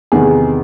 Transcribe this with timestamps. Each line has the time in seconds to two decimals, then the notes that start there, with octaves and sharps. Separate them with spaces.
0.12 E2 C3 D#3 G#4